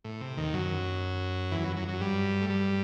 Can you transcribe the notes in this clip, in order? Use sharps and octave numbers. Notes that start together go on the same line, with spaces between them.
A2
C3
D#2 D#3
F#2 F#3
E2 E3
F#2 F#3
F#2 F#3
F#2 F#3
G2 G3
A3
G2 G3